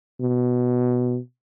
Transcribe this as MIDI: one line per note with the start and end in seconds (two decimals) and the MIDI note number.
0.21 1.19 47